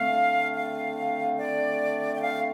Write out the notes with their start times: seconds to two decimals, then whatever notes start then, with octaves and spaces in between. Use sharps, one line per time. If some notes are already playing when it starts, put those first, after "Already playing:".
Already playing: D3 A3 C4 F5
0.55 F5
1.38 D5
2.15 G5
2.21 F5